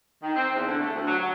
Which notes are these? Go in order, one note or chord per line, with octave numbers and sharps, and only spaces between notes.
D#3
C4
E2
D3
A3
D2
F#3
F#3